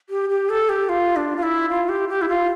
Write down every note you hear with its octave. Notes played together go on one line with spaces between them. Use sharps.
G4
G4
A4
G4
F4
D4
F4
E4
F4
G4
G4
E4
F4